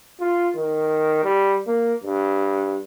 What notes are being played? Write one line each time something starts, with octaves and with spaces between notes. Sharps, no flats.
F4
D#3
G3
A#3
G2